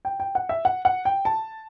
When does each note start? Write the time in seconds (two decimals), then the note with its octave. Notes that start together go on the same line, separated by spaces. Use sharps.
0.05 G5
0.20 G5
0.35 F#5
0.49 E5
0.65 F#5
0.85 F#5
1.05 G5
1.25 A5